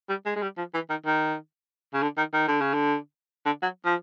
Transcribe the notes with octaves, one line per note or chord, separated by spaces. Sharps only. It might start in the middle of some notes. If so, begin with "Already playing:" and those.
G3
G#3
G#3
G3
F3
E3
D#3
D#3
C#3
D3
D#3
D#3
D3
C#3
D3
D3
F#3
F3